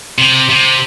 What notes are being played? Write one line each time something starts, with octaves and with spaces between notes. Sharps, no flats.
C3
C3